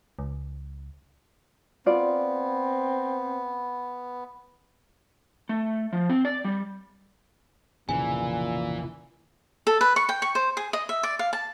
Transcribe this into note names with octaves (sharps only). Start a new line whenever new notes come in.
C#2
B3 C4 F4 D5
A3
F3
C4
D5
G3
F1 A#1 A#2 C#3 E3 G#5
A4
B4
C#6
G5
C#6
C5
G#4
D#5
E5
D5
F5
A5